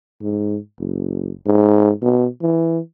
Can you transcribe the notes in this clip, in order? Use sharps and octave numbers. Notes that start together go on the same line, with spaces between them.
G#2
F#1
G#2
B2
E3